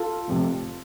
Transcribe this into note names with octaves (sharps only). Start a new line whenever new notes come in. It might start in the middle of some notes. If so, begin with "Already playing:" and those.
Already playing: F4 A4
F1 F2 C3